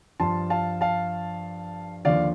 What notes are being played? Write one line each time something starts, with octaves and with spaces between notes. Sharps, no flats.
G2 F3 A5 C6
F5 A5
F5 A5
D#2 D3 F3 D5 F5